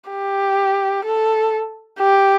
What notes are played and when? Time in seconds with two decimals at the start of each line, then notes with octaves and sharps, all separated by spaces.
0.10 G4
1.05 A4
1.99 G4